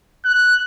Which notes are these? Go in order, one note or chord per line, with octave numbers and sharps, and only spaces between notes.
F#6